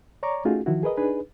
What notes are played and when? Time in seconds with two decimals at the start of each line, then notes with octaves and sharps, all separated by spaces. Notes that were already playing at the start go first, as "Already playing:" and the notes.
0.23 C#5 D5 A#5 C#6 D6
0.45 A3 C#4 D#4 F4 F#4 G#4
0.66 D#3 F3 E4 F#4
0.83 G#4 A#4 B4 D#5
0.97 D4 D#4 G#4 B4